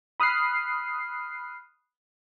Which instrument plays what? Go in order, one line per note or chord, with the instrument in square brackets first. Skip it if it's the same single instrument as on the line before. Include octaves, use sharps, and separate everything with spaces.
[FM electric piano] B5 D#6 F6 F#6 C7